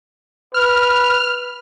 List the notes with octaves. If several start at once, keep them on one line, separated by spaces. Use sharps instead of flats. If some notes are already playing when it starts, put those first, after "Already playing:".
B4 F6